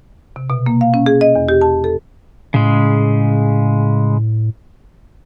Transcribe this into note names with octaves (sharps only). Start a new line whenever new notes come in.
C3
B2
A#3
F5
C#4
G#4
D#5
E2
G4
A5
A4
A2 C#3 G#3